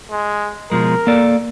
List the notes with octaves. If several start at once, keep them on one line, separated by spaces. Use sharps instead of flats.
G#3
B2 F3 G#3 A#4
A#3 A4 D5